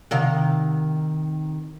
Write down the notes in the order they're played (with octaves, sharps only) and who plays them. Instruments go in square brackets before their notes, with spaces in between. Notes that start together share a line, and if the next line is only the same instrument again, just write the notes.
[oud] C3 D#3 F5